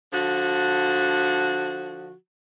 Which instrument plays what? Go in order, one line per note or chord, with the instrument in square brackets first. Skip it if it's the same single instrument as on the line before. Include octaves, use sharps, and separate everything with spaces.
[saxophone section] D3 F3 F#4